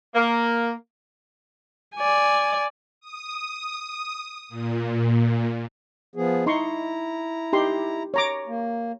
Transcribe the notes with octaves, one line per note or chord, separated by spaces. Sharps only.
A#3
D5 G#5
D#6
A#2
F3 B3 G#4
D#4 E4 A#5 C6 C#6
D#4 G4 C6
C#5 A#5 D6
A#3